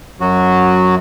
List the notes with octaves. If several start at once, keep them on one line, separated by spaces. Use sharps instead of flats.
F#2 F#3 F#4